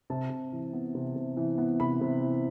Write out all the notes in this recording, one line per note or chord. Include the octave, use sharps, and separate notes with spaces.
C3 A5
C3
E3
B3
C3
C3
E3
B3
C3 B5
C3
E3